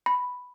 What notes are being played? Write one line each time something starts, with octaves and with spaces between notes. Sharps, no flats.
B5